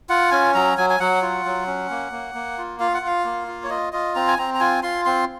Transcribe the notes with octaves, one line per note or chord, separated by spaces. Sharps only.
F4 F#5
C#4 G#5
F#3 A#5
F#3 G#5
G#5
F#3 F#5
F4
F#3
C#4
A#3
A#3
A#3
F4
F4 F5
F#5
F4 F5
A#3
F4
C#5
F4 D#5
F4 D#5
C4 A#5
G#5
C4 A#5
A#5
F4 G#5
F4 C6
C4 C6